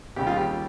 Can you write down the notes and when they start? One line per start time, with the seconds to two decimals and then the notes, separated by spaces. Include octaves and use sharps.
0.16 D#2 C#3 G3 G4
0.27 F4
0.36 G4